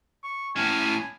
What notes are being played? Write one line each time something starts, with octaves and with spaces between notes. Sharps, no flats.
C#6
A2 C#4 G#5